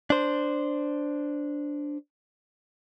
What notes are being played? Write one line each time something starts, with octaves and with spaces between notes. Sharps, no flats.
D4 C5